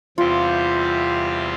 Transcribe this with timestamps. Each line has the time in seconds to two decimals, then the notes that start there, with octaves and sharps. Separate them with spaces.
0.18 E2 C3 G3 C4 F4 G4